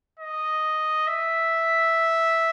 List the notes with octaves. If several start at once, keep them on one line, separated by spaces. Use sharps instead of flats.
D#5
E5